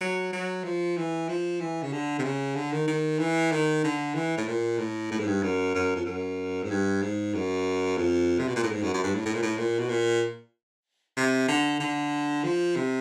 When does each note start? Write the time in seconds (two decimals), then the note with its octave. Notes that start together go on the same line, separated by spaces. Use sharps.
0.01 F#3
0.33 F#3
0.64 F3
0.97 E3
1.29 F3
1.60 E3
1.83 C#3
1.93 D3
2.19 C3
2.24 C#3
2.56 D3
2.72 D#3
2.88 D#3
3.19 E3
3.52 D#3
3.84 D3
4.15 E3
4.37 A2
4.48 A#2
4.78 A2
5.12 A2
5.20 G#2
5.27 G2
5.43 F#2
5.75 F#2
5.96 F2
6.06 F#2
6.64 G#2
6.70 G2
7.02 G#2
7.34 F#2
7.98 F2
8.39 C3
8.48 B2
8.56 A#2
8.64 A2
8.72 G#2
8.82 F#2
8.94 F#2
9.04 G2
9.15 A2
9.26 A2
9.34 A#2
9.42 A2
9.57 A#2
9.79 B2
9.89 A#2
11.17 C3
11.48 D3
11.80 D3
12.44 F3
12.76 C3